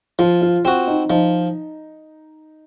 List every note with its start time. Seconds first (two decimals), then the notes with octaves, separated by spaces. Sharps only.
0.19 F3 F4
0.42 F4
0.64 C4 F4 F#4
0.87 D#4
1.10 F3 D#4